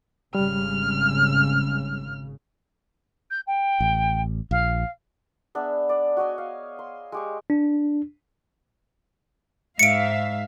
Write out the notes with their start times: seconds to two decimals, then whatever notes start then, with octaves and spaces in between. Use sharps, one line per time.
0.35 G#1 C#3 G3 F6
3.30 G6
3.47 G5
3.80 A1
4.51 A#1 F5
5.55 B3 D4 G#4 E5
5.89 D5
6.17 F#4 C#5 D#5 G#5
6.38 F5
6.79 C6
7.12 G#3 G4 C#6
7.50 D4
9.79 G#2 E5 F5 C#7 D7